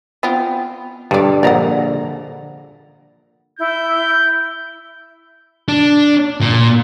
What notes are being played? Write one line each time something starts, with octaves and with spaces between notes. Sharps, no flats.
B3 C4 F4
G2 D3 G3 D4 A4 D5
A#1 D5 F5 F#5 A#5
E4 G6
D4
A#2